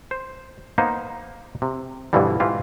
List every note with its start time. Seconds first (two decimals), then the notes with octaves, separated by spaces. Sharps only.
0.11 C5
0.78 A#3 B3 D#4 C5
1.62 C3
2.13 G2 B2 D3 E3 F3 G3
2.40 G#2 E3 F4 G4